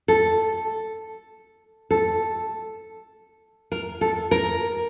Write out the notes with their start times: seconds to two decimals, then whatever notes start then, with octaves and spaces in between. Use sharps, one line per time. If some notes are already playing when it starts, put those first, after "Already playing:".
0.08 A4
1.91 A4
3.72 A#4
4.01 A4
4.31 A#4